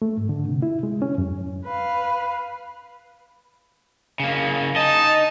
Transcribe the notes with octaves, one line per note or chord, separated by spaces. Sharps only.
A3
G#2
D3
C3
E4
G#3
C#4
F#2
B4 F5
C#3 A#3
D#4 D#5 A5